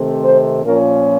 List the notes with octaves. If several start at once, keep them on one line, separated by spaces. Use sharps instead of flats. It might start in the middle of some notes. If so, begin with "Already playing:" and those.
Already playing: C3 D#3 A3 C4
C5
A#2 F3 A#3 C#4 A#4